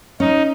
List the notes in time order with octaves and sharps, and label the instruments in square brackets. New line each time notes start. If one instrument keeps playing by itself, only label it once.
[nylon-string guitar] C#4 [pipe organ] D#4